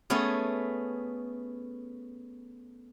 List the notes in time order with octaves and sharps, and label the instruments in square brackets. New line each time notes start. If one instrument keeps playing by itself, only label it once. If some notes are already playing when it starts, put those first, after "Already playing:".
[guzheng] A3 B3 C#4 G#4